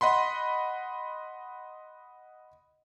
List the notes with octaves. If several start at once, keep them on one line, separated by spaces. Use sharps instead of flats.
D#5 F#5 B5 C6